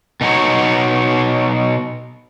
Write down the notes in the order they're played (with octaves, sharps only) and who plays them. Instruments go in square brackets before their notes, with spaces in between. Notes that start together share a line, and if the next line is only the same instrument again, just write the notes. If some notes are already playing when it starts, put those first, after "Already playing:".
[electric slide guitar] B2 D#4 F#4 C#5